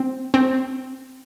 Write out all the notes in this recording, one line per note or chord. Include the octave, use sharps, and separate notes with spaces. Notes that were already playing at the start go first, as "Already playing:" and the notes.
Already playing: C4
C4